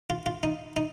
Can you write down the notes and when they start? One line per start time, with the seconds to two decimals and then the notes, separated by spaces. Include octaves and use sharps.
0.10 F4
0.26 F4
0.43 D#4
0.76 D#4